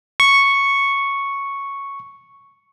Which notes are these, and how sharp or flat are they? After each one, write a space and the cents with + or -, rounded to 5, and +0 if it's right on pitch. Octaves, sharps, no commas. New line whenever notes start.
C#6 +0